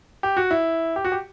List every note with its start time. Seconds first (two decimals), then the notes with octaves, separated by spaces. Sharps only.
0.23 G4
0.37 F#4
0.51 E4
0.96 G4
1.04 F#4
1.12 G4